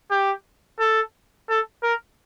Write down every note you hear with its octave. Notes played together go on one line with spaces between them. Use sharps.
G4
A4
A4
A#4